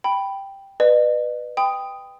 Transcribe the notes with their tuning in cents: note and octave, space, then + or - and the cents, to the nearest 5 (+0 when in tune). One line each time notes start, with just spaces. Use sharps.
G5 +0 B5 +0
B4 +0 D#5 -45
G5 +10 B5 +35 D#6 +0